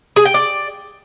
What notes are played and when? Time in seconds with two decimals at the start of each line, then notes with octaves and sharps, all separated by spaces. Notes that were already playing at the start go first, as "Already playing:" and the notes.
0.16 G#4
0.25 G5
0.34 D5